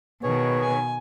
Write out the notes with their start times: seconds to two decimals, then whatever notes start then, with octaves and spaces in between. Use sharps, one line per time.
0.23 B2 D#3 G#4 B4 C#5
0.62 G#5